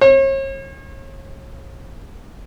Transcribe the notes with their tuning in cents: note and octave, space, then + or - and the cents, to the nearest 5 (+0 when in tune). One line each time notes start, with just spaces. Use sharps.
C#5 -40